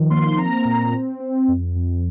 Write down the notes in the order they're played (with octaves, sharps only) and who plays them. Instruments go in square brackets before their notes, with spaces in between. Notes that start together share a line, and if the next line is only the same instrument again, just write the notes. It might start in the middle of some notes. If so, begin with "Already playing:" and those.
Already playing: [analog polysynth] D#3 F3
A#3 C6
C4 A#5
A#2
C4
C4
F2
F2